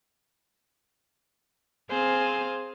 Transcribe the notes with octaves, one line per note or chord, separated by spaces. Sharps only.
C4 G#4 C5 F5 G#5